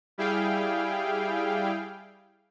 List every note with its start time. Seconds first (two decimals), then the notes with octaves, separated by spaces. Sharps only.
0.18 G3 E4 G#4 F5 G5